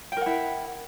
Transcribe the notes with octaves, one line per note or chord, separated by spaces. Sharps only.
E4 A#4 F#5 G5